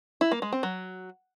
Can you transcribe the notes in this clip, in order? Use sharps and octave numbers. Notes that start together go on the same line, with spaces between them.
E4
A#3
G#3
C4
F#3